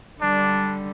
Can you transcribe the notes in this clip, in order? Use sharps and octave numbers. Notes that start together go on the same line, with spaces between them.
D3 G3 D4